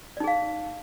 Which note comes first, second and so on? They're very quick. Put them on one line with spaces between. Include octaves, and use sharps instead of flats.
D5 D#4 G#4 F5